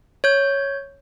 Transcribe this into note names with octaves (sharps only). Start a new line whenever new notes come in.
C#5 G6